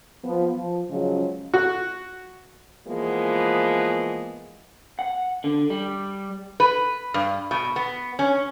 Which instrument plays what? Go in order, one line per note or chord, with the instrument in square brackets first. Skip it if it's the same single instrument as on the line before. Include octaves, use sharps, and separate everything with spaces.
[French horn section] F3 B3
F3
C#3 F3 F#3 G#3 C#4
[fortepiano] F#4
[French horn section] E3 F3 G#3 A#3 B3
[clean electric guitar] F#5
D3
G3
[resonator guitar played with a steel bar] B4
G2
B2
B3
C#4